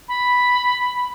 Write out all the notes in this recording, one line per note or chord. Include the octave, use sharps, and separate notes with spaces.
B5